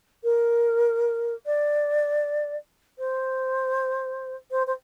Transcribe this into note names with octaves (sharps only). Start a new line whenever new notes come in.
A#4
D5
C5
C5
C5